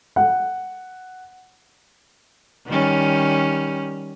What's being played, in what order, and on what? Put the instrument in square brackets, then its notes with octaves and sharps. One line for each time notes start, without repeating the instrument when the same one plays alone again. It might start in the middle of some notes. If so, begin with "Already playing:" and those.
[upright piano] F#5
[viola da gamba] D#3 G3 C#4